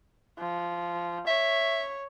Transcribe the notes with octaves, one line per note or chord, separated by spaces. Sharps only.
F3
C#5 E5